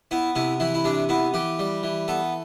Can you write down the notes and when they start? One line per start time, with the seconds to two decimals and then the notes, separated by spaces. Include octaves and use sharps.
0.11 B3 E4
0.35 C3 E4
0.60 E3 E4
0.74 E4
0.84 C3 D4
1.09 B3 E4
1.34 E3 G4
1.59 G3
1.83 E3
2.08 B3 A4